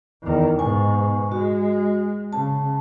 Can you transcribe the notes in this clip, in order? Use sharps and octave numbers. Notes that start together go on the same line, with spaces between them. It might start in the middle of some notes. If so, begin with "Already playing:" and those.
E2 D#3
G#2 B2 G#5 C#6
G#3 F#4
C#3 A5